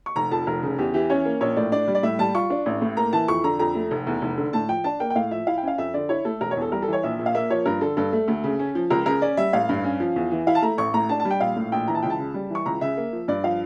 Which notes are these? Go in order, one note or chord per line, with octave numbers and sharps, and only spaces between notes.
C#6
F1 A#5
F2 A5
F1 A#4
C#3
E2 G4
E3 G4
C#4 C#5
A#3
A#1 C#5
A2 D5
D4 D5
G3
D5
A2 E5
G3 A5
F4 C#6
D4
A1
A2
A#3 A#5
E3 A5
F2 C#6
D3 A#5
F2 A#5
A3
F1
E2
F1
D3
A2 A5
F3 G5
D4 A5
A#3 G5
G5
A2 F5
F3 E5
E4 F5
G5
C#4 F5
F2 E5
D3 D5
E4 C#5
A3 A4
E1 A#4
C#5
E2 A4
G3 A#4
A4
E3 C#5
A#1 E5
A#2
F5
A#3 E5
F3 C#5
G2 A#4
D3 A4
G2 A4
A3
D2
C#3
C#4
F3
C#2 A#4
C#3 A#4
C#4 D5
G3 E5
A1 F5
G2
C#4
F3
E2
E3
E4 F5
A5
A3 A#5
A1 C#6
A2 A#5
D4 A5
A5
G3
G5
A#1 F5
A2
A#1 G5
E3 A#5
A5
C#2 G5
A5
C#3
G3
E3 C#6
C#2 A#5
C#3 E5
A#3
F3
G2 D5
F3 F5